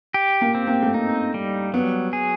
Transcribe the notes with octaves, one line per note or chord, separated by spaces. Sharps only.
G4
A#3
C4
A#3
A3
A#3 D#4
G3
F#3 B3
G#4